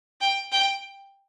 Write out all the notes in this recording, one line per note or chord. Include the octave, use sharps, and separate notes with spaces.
G5
G5